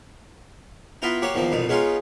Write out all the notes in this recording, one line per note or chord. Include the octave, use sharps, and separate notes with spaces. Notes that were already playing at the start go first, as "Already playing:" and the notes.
B3 E4 F4 G5 A#5
A#3 F#4 G4 C#5
E2 D#3 F3 A#3
C2 F2 B2 D#4
G#3 B3 C#4 D#4 F4